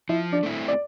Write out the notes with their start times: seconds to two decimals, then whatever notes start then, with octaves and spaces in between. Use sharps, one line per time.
0.09 F3 E4 E5
0.32 D4 D5
0.43 A3 C4 E4
0.68 D5